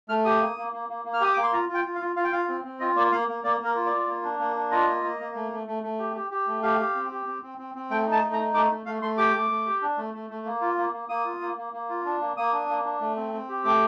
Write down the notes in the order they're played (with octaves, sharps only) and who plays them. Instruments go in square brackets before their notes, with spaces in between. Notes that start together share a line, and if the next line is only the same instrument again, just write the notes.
[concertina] A3 F6
G4 D#6
A#3
A#3
A#3
A#3
A#3
F6
G4 D#6
A#3 D6
C6
F4 A#5
F4
G5
F4
F5
F4
F4 F5
G5
F4 F5
C4
C4
F4 D#5
A#3 D5
A#3 F5
A#3
A#3 D5
A#3 A#4
F4
D5
F4
A#3
D4
A#3
D4
F4 D#5
A#3
A#3
A#3
A3
A3
A3
A3
G4
G4
G4
A3
G4 F5
G4
C4
G4
C4
C4
C4
C4
A3 G5
D#4
A5
A3
A#5
D#4
A3 D6
A3
A3 F5
A3 C6
G4 D6
A3
A3
G4
D4
A3
A3
A3
A#3
F4
A#3
A#3
A#3 D#6
F4
A#3
A#3
A#3
F4
D4
A#3
A#3 D#6
D4
A#3
D4
A3
C4
C4
G4
A3 D6